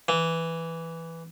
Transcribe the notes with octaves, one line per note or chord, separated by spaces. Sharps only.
E3